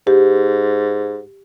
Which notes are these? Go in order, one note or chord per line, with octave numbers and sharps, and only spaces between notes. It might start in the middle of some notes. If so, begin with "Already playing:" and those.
G#2 G4